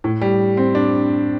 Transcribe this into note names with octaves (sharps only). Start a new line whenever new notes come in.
A2
G3
C4
D4